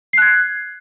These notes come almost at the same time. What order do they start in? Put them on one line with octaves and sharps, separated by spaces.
C7 F#6 G#6